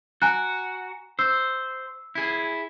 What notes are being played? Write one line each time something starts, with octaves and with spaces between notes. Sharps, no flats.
F#4 G#5 A#5 F#6
C5 E6
E4 G#4